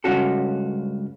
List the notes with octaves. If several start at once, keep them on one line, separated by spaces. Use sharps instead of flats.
C#2 G2 C#4 F#4 A4